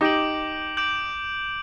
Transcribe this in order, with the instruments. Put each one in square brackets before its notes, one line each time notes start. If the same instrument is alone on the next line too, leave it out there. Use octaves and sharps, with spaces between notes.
[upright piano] D#4 G4 [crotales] D6 G6 D7 F#7
[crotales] D6 G6 D7 F#7